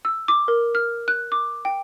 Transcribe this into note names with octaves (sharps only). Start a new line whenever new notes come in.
E6
D6
A#4
F6
F#6
D6
G5